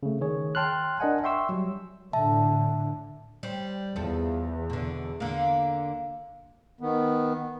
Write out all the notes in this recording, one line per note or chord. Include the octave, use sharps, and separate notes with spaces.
C#3 A3
D#3 G#4 C#5
G5 A5 C6 F6 F#6
D4 A#4 D#5 F#5 G#5
E5 G5 C6 C#6 E6
F#3 G3
A2 D3 E5 A5
G3 C5
E2 F3 A4
B2 D3
D3 A#3
D#3 B3